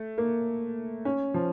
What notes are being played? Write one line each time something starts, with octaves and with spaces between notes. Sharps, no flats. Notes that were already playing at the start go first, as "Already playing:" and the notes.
Already playing: A3
A#3
C#4
F3